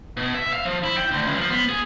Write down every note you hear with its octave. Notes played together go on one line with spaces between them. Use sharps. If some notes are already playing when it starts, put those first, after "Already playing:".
B2
E5
F5
F3
E4
G5
D2
C#2
F3
B3
G#4